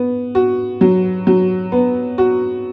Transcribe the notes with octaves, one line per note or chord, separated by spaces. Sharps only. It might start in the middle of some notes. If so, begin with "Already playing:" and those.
Already playing: B3
F#4
F#3
F#3
B3
F#4